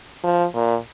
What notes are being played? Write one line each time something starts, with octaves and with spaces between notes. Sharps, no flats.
F3
A#2